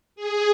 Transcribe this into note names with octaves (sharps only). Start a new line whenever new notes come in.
G#4